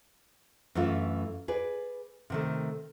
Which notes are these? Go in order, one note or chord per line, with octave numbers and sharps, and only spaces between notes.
F#2 E3 A3 D4 E4 F4
G#4 B4 D5
C3 D#3 A3